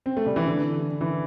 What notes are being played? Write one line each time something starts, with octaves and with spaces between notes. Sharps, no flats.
C4
A3
G3
E3
D3
E3